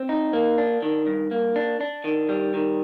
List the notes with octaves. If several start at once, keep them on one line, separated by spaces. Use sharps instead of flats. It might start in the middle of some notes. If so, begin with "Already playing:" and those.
Already playing: C4
D#4
A#3
D4
D#3
G2
A#3
D4
D4
D#3
G3
D#3